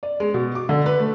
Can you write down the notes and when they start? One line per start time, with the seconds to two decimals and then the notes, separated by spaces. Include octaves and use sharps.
0.03 D5
0.20 G#3
0.34 B2
0.55 D6
0.69 D3
0.86 B4
0.99 A3